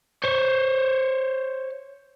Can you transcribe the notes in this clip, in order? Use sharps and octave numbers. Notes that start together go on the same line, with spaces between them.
C5 C#5